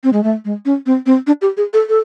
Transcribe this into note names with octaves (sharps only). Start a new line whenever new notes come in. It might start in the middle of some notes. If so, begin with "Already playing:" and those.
C4
G#3
A3
G#3
C#4
C4
C4
D4
G4
G#4
A4
A4